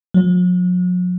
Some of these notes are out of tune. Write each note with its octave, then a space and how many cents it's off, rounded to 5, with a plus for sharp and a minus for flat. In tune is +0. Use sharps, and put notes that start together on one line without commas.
F#3 -45